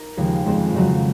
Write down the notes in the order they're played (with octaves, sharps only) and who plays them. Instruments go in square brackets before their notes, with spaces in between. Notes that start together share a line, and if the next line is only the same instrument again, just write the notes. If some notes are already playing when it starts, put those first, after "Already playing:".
Already playing: [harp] D#4 A#4
D#2 C#3 F3 G#3
F2 C#3 G#3 C4
F2 C#3 F#3